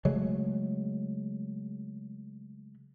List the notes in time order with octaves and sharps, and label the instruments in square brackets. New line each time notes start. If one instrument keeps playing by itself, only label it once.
[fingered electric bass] C#3 F#3 G#3 A3